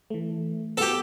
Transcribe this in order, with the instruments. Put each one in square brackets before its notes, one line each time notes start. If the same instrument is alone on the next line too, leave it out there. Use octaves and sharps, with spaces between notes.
[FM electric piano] E3 A3
[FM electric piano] B3 F#4 [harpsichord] G4 A4